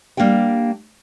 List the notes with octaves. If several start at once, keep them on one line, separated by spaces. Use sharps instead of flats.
G3 A#3 D4 G4 G5